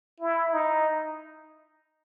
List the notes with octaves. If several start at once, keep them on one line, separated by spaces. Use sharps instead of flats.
E4
D#4